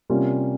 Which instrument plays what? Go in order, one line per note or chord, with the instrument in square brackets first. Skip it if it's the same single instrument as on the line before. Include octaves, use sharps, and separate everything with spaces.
[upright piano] C3 G3 A#3 C#4 F4